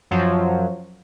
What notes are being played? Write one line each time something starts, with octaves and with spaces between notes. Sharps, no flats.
F#2 F3 F#3